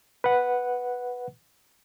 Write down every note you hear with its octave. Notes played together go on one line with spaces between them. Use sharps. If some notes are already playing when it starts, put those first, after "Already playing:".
B4 F#5